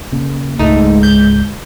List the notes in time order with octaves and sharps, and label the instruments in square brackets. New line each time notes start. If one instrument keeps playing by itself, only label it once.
[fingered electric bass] C#3 [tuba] A#3
[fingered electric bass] C#2 G#2 [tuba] G#3 [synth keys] A3 D#4
[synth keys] G6